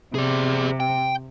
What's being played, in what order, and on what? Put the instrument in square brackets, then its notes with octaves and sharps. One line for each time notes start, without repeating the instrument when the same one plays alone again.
[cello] C3 [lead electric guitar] G#4 D5
[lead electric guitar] G5